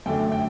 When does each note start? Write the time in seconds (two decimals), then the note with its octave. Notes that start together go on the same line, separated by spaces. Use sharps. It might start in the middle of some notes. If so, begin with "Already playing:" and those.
0.06 F#2 D3 A3 D4 G5
0.32 G5